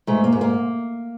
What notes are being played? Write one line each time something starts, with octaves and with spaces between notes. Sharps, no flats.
G#2 A3
A#3
G#2
A#3